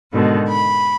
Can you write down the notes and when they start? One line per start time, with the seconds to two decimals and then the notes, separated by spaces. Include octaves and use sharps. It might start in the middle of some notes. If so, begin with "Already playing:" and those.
0.12 G#2 B2 D3 D#3
0.49 B5